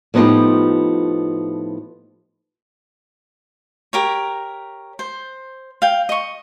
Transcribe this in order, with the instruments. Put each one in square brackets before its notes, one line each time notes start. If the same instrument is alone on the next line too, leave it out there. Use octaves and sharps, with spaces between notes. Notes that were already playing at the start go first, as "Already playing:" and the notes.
[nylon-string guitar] A2 F3 B3 D#4 F4 G4
[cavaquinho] G4 A#4 C#5
C5
F5 G5
D#5 C#6